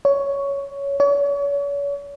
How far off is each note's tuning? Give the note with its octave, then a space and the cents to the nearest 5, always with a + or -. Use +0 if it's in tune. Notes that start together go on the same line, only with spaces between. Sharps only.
C#5 +10
C#5 +40